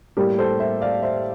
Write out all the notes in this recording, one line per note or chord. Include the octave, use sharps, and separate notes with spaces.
A2 G3 A#3 G4 A#4
A4 C5
C5 E5
D5 F5
C5 E5